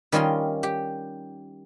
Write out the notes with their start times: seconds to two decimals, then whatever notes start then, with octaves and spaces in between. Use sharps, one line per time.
0.12 D#3 G3 C#4 F4 D#5 C6
0.63 G4